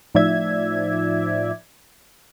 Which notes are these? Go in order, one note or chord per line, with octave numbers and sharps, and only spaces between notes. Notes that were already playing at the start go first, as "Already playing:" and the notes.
A2 F3 D#4 D5 E5 G#6